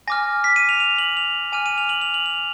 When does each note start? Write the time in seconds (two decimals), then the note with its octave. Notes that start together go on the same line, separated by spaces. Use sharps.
0.07 G#5 D6 F6 A#6
0.44 B6
0.56 D#7
0.69 F7
0.80 F7
0.98 F#7
1.17 F7
1.52 G#5 D6 F6 D#7
1.66 D#7
1.78 F7
1.89 F#7
2.02 F7
2.14 F#7
2.26 F7